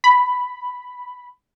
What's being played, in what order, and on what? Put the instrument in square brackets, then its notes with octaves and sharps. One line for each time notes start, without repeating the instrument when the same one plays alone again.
[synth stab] B5